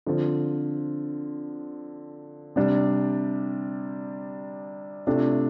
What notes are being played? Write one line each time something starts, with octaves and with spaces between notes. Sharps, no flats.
D3 F3 C4 F4
C3 G3 D4
C3 A3 D4 F4